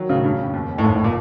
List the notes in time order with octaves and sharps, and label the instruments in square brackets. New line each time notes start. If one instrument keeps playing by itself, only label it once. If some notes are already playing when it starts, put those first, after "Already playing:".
Already playing: [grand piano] D#3 F#3
[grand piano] A2 [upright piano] C#3
[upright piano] G2 [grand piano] C#3
[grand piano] F2
D#2
D#2
[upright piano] A2
[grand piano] G1 [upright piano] G#2
[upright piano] A2
A#2